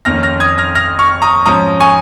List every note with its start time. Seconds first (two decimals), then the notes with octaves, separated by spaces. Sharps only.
0.05 F2 D#3 A#3 C#4 F6 A#6
0.23 F6 A#6
0.40 D#6 G#6
0.58 F6 A#6
0.75 F6 A#6
0.99 C#6 F6
1.22 A#5 D#6
1.45 G#2 F3 C#4 A#5 D#6
1.80 G#5 C#6